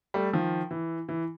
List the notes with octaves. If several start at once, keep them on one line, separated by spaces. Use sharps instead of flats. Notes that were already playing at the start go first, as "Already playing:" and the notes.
G3 A3
D#3 F3
E3
E3